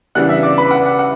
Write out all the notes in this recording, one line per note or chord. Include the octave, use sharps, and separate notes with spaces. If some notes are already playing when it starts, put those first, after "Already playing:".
C#3 E3 G3 B3 D4 F#5 F#6
E5 E6
D5 D6
B4 B5
F#5
F#5
F#5